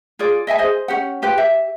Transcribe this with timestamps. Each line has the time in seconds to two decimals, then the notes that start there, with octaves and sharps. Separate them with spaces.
0.19 F4 G#4 D5
0.47 D#5 E5 G5 G#5
0.59 G#4 C5 D#5
0.88 C#4 G4 F#5
1.22 F4 G4 B4 G5
1.37 G4 E5